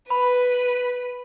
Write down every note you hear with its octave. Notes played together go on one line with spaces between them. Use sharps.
B4 B5